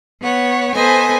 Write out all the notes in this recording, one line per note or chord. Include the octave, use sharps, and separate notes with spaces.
B3 C#5 F#5
B3 A4 B4 C5 D#5 G#5